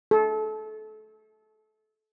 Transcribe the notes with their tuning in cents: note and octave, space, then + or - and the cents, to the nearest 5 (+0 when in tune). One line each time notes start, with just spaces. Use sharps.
A4 -25